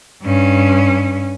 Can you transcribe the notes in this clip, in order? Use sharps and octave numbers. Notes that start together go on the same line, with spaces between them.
G2 C#4